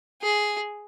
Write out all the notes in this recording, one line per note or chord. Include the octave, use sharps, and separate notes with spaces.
G#4